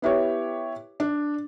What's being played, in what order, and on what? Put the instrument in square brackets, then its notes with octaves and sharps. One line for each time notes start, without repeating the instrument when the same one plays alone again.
[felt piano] B3 E4 G4 C#5
D4